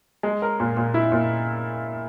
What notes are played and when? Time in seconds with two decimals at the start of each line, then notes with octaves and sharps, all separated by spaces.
0.23 G#3
0.42 A#4
0.60 A#2
0.77 A#2
0.94 E4
1.12 A#2